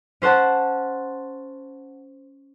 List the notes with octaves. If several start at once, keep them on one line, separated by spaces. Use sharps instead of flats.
C#4 C5 F#5 A5